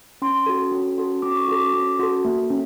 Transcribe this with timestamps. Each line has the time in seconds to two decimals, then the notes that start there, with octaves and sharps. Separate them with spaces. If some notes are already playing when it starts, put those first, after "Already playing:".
0.22 C#4 C6
0.46 F#4 A4
0.72 C#4
0.98 F#4 A4
1.22 C#4 D6
1.36 C#6
1.48 F#4 A4 D6
1.74 C#4
1.99 F#4 A4
2.25 A#3
2.50 C#4